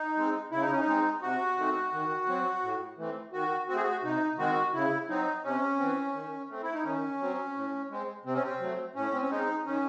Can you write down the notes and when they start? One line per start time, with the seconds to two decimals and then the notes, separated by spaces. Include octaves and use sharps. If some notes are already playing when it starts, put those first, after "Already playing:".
Already playing: D#4
0.17 G#3 C4
0.51 C#3 E4
0.62 D#4
0.71 C#4
0.80 D#4
0.87 G#3 C4
1.22 C3 F#4
1.58 D#3 A3 C4
1.93 D#3
2.28 F#3 C4
2.63 A2
2.98 E3 A3 C4
3.33 D#3 F#4
3.68 C4 F#4
3.73 A3 G#4
3.83 F#4
4.03 C3 D#4
4.38 D#3 G#3 C4 F#4
4.74 C#3 E4
5.09 F#3 C4 D#4
5.44 C3 C#4
5.79 E3 C4
6.14 D#3
6.49 A3 C4
6.63 E4
6.73 D#4
6.84 D#3 C#4
7.20 F#3 C4
7.55 A2
7.90 G#3 C4
8.25 C3 C4
8.34 C#4
8.43 C4
8.60 F#3 A3
8.95 A2 C#4
9.12 C4
9.22 C#4
9.30 G#3 C4 D#4
9.66 D#3 C#4